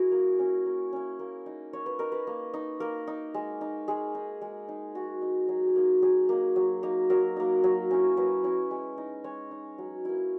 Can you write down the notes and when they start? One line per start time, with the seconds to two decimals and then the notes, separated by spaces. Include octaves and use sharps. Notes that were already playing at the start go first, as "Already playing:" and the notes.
Already playing: E4 F#4 G#4 A#4
0.12 A#3
0.39 C#4 E4
0.66 A#3
0.93 C#4 E4
1.19 A#3
1.46 D#4
1.73 A#3 C#5
1.86 B4
1.99 D#4 A#4
2.12 B4
2.27 A#3
2.54 D#4
2.80 A#3 A#4
3.07 D#4
3.34 G#3
3.61 D#4
3.88 G#3 G#4
4.15 D#4
4.41 G#3
4.68 D#4
4.95 G#3 F#4
5.22 D#4
5.49 F#3 G#4
5.67 G#4
5.76 A#3 D#4
6.02 F#3 G#4
6.29 A#3 D#4
6.56 F#3
6.83 A#3 D#4
7.10 F#3 A#4
7.36 A#3 D#4
7.64 F#3
7.91 C#4 E4
8.17 F#3 B4
8.44 C#4 E4
8.71 G#3
8.98 D#4
9.24 G#3 C#5
9.51 D#4
9.78 F#3
10.05 A#3 E4